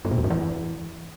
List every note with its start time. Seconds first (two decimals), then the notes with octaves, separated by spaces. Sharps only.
0.05 G2
0.11 A#2
0.18 E2
0.24 G#2
0.30 E3